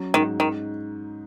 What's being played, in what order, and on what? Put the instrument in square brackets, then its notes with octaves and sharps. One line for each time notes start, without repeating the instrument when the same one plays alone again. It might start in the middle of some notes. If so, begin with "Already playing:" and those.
Already playing: [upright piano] F#3 C#4
[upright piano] G#2 [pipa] D#3
[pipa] D#3 [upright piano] D#4